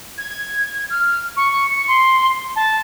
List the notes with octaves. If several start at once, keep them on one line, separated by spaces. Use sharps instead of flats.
G#6
F6
C#6
C#7
C6
A5